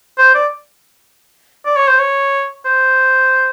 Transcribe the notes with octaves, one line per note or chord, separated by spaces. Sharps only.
C5
D5
D5
C#5
C5
C#5
C5